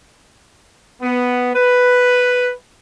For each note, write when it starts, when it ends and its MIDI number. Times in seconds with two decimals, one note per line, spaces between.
1.02 1.53 59
1.56 2.53 71